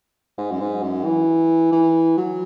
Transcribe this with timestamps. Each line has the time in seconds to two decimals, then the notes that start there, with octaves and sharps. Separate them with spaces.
0.38 G#2
0.51 F#2
0.60 G#2
0.82 F#2
1.04 E3
1.72 E3
2.17 F#3